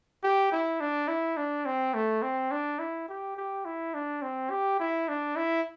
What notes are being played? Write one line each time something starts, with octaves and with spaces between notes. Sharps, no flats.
G4
E4
D4
E4
D4
C4
A3
C4
D4
E4
G4
G4
E4
D4
C4
G4
E4
D4
E4